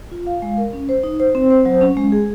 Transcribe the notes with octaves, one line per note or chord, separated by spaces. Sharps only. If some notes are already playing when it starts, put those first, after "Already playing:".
F4
F5
G#3
A#4
C#4
C5
D#4
C5
C4
C5
F#3
C#4
G#3
G#4